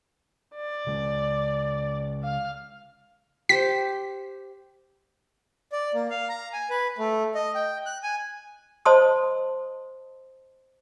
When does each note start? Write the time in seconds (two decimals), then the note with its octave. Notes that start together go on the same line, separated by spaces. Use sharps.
0.55 D5
0.87 C#3 G#3
2.23 F5 F6
3.49 G4 C5 B6
5.72 D5
5.94 A#3
6.11 F5
6.29 A#5
6.53 G#5
6.70 B4
6.98 A3
7.35 D#5
7.55 G5
7.86 F#6
8.03 G#5
8.85 C5 D#5 A5 C6 D#6